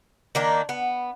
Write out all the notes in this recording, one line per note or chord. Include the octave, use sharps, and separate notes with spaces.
D#3 A#3 D4
B3